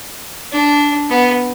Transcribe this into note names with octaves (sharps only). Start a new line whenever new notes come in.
D4
B3